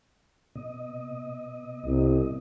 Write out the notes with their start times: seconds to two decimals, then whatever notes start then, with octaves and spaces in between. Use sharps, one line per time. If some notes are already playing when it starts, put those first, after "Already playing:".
0.55 B2 D#5
1.85 C2